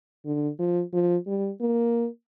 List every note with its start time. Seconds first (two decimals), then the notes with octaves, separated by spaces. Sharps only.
0.26 D3
0.59 F3
0.93 F3
1.27 G3
1.61 A#3